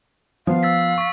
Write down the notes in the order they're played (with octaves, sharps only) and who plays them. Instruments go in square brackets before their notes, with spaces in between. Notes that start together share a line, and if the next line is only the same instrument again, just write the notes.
[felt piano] F3 B3 [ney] F5
[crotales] E6 A6 B6
C#6 B6